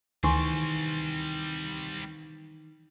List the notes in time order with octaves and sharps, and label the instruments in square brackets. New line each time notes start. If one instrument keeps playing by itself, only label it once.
[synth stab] D2 [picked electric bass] D#3 E3 [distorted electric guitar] G3 C4 [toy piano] G#5 C6 C#6